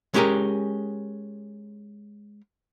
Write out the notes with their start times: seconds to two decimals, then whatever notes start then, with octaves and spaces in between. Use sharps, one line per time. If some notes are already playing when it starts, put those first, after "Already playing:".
0.14 G#3 C#4 G4 G#4 A#4